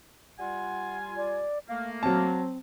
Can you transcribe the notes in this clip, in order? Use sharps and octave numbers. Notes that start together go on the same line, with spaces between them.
G3 F4 F#5 G#5
D5
A3 A#3 F5
F#3 C4 A5